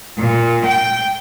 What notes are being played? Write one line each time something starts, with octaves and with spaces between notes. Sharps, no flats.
A#2
G5